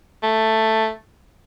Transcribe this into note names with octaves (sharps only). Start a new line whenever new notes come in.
A3